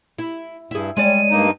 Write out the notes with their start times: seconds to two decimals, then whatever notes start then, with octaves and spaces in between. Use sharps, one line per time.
0.18 E4
0.71 G2 E4 G#4
0.97 G3 G#3 C#5 D5 D#7
1.31 G2 A#3 D#4